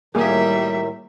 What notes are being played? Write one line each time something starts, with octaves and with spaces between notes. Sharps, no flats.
A2 D#3 F#3 G3 A#3 G#4 E5